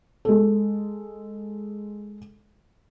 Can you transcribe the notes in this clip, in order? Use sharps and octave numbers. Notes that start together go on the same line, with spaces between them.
G#3 A4